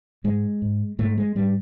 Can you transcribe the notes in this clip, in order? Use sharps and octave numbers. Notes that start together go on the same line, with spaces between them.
G#2 G#3
G#2
G#2 A3
G#3
G#2 G3